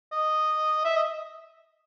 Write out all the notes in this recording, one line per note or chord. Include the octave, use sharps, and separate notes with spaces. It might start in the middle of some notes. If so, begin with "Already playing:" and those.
D#5
E5
D#5